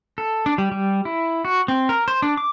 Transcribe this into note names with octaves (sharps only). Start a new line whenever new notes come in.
A4
D4
G3
G3
E4
F#4
C4
A#4
C5
D4
D6